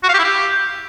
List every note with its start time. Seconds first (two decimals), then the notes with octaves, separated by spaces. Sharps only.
0.04 F#4
0.09 F5
0.14 G4
0.19 E4
0.24 G4